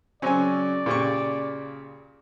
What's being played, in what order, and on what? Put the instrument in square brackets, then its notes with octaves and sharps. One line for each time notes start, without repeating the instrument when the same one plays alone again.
[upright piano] C#3 F#3 C#4 [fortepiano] C4 G#5 [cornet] D5
[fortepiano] A#2 G4 C#6 [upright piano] C#3